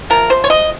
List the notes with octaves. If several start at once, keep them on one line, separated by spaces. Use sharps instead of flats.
C3 F3 A#4
C5
C#5
D#5